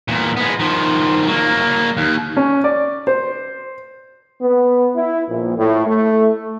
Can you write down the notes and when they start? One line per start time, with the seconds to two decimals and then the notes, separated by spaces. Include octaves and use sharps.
0.08 E2 A#2
0.37 G#3 B3
0.59 D#3 F3
1.27 F#3 A#3
1.97 D#2
2.37 C#4
2.64 D5
3.07 C5
4.42 B3
4.95 E4
5.28 A#1
5.57 A2
5.87 A3